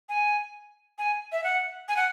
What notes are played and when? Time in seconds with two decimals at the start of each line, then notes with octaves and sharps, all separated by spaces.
0.09 G#5
0.98 G#5
1.32 E5
1.44 F#5
1.88 G#5
1.97 F#5